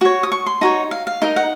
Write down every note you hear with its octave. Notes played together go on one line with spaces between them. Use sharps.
F#4 C#5 C#6
D#6
C#6
C6
D#4 F#4 C#5 A#5
F5
F5
D#4 A#4 D#5
F#5